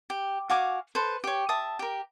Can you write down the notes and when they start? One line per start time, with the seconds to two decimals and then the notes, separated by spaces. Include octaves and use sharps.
0.10 G4
0.50 F#4 F5 G#5 D6
0.95 A4 B4 C5
1.24 G4 C#5
1.49 E5 A5 D#6
1.79 G4 A#4